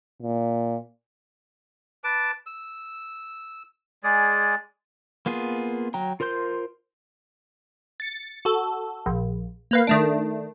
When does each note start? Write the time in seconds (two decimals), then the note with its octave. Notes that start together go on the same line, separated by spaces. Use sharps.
0.22 A#2
2.04 B4 A5 D6
2.46 E6
4.03 G#3 G#4 D5
5.26 A#3 B3 F4 G#4
5.94 F#3 G5 A#5
6.20 F4 A#4 C5 C6 G6
8.00 A6 C#7
8.45 F#4 A4
9.06 A#1
9.71 A#3 B4 F5
9.87 D#3 A3 D4